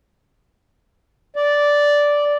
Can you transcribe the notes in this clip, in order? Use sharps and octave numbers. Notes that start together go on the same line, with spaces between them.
D5